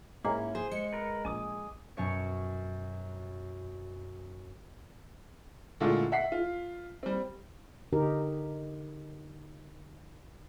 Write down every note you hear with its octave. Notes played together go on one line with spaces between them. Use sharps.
G#2 A#3 C#4 E4
G#4 C5
G#3 C#7
A#4 B4
A#1 G#5 D6 D#6
F#2 B2 C#5 C#7
A#2 D3 G#3 A3 E4 F4
E5 F#5 B6 C7
F4
G3 C4
D3 D#4 G4 A#4